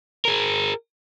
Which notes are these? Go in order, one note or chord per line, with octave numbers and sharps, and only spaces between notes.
G#4 A#4